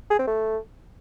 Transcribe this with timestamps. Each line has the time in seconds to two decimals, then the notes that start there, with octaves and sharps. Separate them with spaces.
0.10 G#4
0.19 C4
0.27 A3